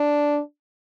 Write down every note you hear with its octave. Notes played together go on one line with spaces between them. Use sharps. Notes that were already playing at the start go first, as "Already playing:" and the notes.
Already playing: D4